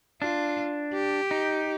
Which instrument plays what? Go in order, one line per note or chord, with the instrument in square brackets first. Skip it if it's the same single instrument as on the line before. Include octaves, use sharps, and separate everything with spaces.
[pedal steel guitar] D4 [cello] F4
[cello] G4
[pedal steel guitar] D#4